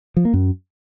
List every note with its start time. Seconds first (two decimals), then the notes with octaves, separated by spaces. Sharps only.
0.17 F3
0.25 A#3
0.34 F#2